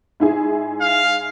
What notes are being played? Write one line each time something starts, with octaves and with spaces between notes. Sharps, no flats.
G#2 E4 G#4
F5